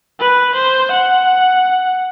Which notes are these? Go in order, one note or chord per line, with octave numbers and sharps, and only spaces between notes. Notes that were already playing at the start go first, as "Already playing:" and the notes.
B4
C5
F#5